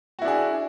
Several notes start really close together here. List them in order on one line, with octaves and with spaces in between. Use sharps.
F#4 E4 D4 G#4